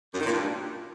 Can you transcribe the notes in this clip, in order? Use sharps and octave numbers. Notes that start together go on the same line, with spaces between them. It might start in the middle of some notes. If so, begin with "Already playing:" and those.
F#2
D#3
A#2
G2